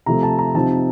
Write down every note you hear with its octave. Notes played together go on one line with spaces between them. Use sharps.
C3 F3 A3 A#5
A5
A#5
C3 F3 C4 D#4 A5